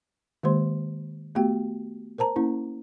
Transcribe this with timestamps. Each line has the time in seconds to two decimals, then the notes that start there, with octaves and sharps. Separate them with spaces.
0.43 D#3 G#3 A#3 G4 C5 C6
1.35 A3 B3 F#4 G4 G5
2.18 A#4 C5 A5 A#5
2.36 A#3 C#4 E4